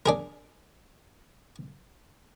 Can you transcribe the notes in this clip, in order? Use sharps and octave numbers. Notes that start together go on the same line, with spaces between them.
D4 G#4 A#4